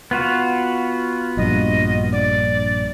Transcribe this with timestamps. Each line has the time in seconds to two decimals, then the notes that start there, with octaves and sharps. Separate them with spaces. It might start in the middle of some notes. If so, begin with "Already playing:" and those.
0.11 B3 F4 F#4
1.37 A#1 G2 D#5
2.12 D5